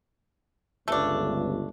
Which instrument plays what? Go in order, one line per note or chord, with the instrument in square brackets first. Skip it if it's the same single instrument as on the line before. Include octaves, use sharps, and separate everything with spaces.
[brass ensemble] G1 C#2 [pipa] A3 D4